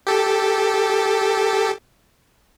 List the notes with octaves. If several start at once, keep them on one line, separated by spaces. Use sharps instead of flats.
G4 A4